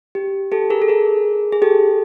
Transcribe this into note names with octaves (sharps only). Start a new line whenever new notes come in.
G4
G4 A4
G#4 A#4
A4
G#4 A#4
G#4
G4 A4